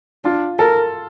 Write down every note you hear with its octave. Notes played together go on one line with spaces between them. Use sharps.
D4 F4
A4 A#4